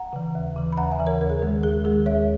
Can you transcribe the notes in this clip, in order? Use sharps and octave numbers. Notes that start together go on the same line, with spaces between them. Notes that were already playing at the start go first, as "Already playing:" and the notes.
Already playing: F#5 A#5
C#3 E3
D#2
C#3 E3
B5
D#2 F#5 A#5
E5 G#5
C#3 E3
A#4 C#5
D#2 A#4
G#4
D#3 G#3 A#4
D#2 G#4
D#3 G#3 G#4
D#2 C#5 E5